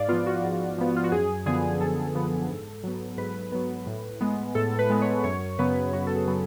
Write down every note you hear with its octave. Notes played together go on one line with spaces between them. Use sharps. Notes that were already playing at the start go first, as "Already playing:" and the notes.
Already playing: G#2 D5 F5
F3 B3 F4
F#4
G#2
F3 B3
F4
F#4
F#2 G#4
D3 F3 B3 G#4
F#2 A4
D3 F3 B3
G#2
F#3 B3
G#2 B4
F#3 B3
A2
G#3 B3
A2 A4
B4
G#3 B3
C#5
F#2 C#5
C#3 F#3 B3 B4
F#2 F#4
A4
G#4
C#3 F#3 B3